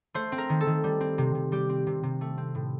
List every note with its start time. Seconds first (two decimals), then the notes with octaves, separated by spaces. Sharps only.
0.14 A3 C5
0.32 C4
0.38 A#4
0.49 D#3
0.61 A4
0.67 D#3
0.84 G3
1.00 C4
1.18 C3
1.35 C3
1.52 G3 G4
1.69 C4
1.87 C3
2.03 C3
2.21 A3
2.38 C4
2.55 A2